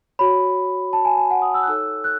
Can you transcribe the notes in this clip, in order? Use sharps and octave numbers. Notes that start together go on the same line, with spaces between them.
F#4 C#5 B5
A5
G#5
G#5
F#5
D#6
E6
F#6
D#4 A4 C#5 E6
F#6